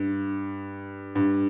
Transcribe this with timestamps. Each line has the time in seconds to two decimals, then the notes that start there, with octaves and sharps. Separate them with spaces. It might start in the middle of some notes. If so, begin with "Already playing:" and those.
Already playing: G2
1.15 G2